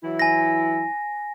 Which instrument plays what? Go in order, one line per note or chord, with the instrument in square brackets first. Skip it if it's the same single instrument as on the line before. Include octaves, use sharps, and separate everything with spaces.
[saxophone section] E3 F#3 E4
[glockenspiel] G#5 A#6